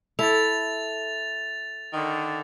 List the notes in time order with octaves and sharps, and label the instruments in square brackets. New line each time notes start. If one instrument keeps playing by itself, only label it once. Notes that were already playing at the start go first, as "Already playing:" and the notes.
[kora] E4 [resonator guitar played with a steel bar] A4 [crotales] A6 F7
[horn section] D3 D#3